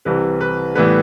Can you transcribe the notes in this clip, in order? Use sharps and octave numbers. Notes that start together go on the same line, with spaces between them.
C2 C3 E3 B4
B4
A2 E3 G3 B3 B4